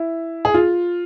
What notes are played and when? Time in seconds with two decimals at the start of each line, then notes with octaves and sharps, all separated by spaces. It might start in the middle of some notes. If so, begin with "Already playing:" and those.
Already playing: E4
0.45 G#4
0.54 F4